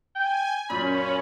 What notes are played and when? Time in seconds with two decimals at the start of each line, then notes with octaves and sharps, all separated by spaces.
0.16 G5 G#5
0.70 F#2 A#2 C#4 B5